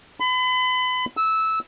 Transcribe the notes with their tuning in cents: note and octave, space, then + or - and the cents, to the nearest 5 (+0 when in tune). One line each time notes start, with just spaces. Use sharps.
B5 +35
E6 -15